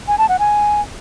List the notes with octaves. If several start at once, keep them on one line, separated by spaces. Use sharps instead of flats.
G#5
A5
F#5
G#5